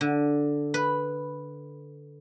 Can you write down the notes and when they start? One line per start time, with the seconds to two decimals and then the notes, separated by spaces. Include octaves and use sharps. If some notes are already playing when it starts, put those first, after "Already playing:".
0.01 D3
0.74 B4